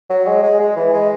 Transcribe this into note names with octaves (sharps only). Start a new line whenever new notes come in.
F#3
G#3
G#3
G#3
E3
G#3